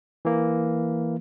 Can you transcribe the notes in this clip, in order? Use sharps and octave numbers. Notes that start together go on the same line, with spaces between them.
E3 A#3